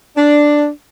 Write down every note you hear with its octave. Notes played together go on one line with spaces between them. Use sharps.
D4